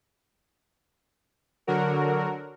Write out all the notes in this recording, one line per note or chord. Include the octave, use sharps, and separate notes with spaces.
D3 F#3 F#4 A#4